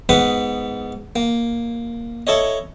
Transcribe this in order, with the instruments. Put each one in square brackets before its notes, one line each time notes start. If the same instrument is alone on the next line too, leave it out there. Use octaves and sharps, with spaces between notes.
[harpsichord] G#2 B3 B4 B5 D6 D#6
A#3
E4 A4 C#5 D#5